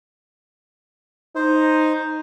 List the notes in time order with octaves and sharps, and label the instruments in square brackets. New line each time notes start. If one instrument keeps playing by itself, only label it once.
[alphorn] D#4 [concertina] C5